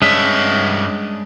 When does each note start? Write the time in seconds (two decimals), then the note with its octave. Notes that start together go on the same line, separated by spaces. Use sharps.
0.02 G2 G#3 C#4 D4 E5